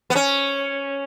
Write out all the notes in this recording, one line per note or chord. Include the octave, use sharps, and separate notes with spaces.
B3
C#4